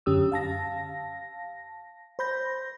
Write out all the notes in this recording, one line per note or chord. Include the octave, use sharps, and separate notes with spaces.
F#2 D3 C#4 G4 D#6 E6
F5 A5 A#6
C5 B5 G6 A#6